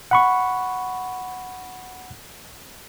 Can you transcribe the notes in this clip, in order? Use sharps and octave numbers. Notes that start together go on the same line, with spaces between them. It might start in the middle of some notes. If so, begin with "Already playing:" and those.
F#5 B5 C#6